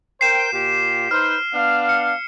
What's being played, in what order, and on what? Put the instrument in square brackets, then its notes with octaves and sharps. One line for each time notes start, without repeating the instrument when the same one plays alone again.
[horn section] A#4 C5 G5 [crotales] C7 E7
[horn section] A#2 F4 G4
[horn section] D#4 B4 C5 [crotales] F6
[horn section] B3 D4 F5
[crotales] C#7